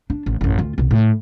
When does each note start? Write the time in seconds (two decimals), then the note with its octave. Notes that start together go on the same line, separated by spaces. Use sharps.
0.10 D4
0.26 A1
0.41 A1 F#2
0.58 D2 F4
0.78 C2 B2
0.91 A2